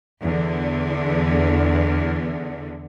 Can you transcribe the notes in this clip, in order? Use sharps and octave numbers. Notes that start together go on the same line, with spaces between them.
E2 D3